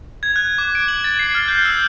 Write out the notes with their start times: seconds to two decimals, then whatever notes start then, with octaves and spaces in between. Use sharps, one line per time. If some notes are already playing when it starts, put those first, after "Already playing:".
0.23 G#6
0.36 F#6
0.58 D6
0.75 D7
0.88 F#7
1.04 A6
1.19 C7
1.35 F6
1.48 G6
1.65 E6